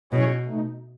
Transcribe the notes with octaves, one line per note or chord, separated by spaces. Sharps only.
B2 F#3 C#4 E4 G#4 C#5
B2 A3 D#4